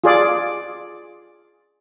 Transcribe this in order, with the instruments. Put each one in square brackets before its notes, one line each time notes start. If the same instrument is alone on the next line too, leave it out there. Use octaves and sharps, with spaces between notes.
[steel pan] F4 G#4 D5